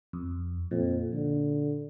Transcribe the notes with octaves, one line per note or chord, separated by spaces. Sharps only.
F2
F2 A#2
D3